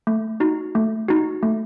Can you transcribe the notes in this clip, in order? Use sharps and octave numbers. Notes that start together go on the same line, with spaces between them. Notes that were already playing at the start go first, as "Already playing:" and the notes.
A3
D#4 F#4
A3
D#4 F#4
A3